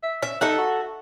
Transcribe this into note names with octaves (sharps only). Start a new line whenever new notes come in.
E5
C#4 E5
D#4 A4 E5 F#5
F#4